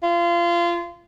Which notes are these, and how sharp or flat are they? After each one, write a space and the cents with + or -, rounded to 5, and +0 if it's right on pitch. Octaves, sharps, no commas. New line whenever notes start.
F4 -25